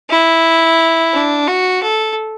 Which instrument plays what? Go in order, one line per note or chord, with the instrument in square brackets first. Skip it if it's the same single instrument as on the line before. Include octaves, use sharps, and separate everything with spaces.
[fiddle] E4
D4
F#4
A4